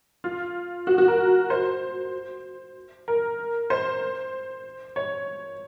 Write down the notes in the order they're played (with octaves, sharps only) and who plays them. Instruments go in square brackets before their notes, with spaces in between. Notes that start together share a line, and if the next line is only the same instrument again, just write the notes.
[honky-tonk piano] F4
F#4
F#4
A#4
C5
A#4
C5
C#5